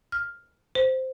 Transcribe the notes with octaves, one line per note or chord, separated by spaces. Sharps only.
F6
C5